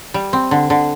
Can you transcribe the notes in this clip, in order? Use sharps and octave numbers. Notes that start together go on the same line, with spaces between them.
G3
C4
D3
D3